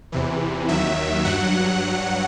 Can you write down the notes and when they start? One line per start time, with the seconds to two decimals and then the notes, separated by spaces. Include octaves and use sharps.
0.12 E2 C3 E3
0.68 D#2 D#3 F#3 E5
1.25 G2 F#3 F#5